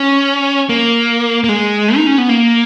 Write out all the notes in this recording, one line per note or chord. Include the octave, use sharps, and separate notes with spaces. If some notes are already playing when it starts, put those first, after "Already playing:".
Already playing: C#4
A#3
A#3
G#3
D#4
C#4
B3
A#3